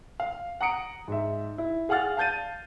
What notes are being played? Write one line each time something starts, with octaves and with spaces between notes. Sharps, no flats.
F5
F#5 A#5 D#6 C#7 D7
G#2 E5
E4
G#4 F5 F#5 F6 A6
F5 A5 G6 A6 D#7